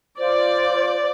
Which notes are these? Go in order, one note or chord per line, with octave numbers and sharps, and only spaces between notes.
F4 C5 D5